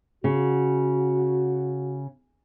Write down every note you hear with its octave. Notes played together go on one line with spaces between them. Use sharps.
C#3 F#4